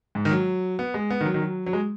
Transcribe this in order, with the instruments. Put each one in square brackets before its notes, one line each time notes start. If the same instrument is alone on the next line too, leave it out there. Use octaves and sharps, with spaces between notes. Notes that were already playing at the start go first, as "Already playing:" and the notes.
[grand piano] G#2
D#3
F#3
B3
G#3
B3
D#3
F#3
D#3
F#3
F#3
G#3